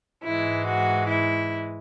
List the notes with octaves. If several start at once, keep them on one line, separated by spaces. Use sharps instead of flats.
G#2 E3 G#3 E4
F#4
E4